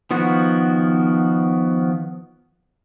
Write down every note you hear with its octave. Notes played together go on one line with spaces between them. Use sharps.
D#3 F3 B3 F#4